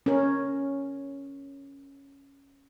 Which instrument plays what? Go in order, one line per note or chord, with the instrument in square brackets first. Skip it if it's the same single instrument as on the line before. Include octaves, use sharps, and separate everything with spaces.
[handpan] C#4 A#4